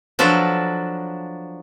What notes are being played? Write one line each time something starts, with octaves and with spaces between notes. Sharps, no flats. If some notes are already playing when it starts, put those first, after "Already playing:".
F3 F#3 D4 A4 B4 A#5